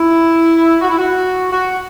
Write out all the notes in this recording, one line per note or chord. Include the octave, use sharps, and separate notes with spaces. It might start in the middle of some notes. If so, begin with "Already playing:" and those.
Already playing: E4
F#4
E4
F#4
F#4